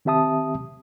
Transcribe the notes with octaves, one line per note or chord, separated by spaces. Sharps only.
D#3 C4 G4 E5 A5 D#6